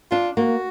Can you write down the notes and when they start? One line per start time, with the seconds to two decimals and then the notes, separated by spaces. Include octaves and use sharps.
0.11 D4 F4
0.37 A#3 F#4